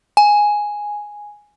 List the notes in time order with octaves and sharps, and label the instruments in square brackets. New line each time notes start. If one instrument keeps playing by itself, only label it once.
[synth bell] G#5